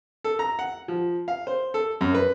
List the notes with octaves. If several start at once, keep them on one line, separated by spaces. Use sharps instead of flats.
A4
A#5
F#5
F3
F5
C5
A4
F#2
B4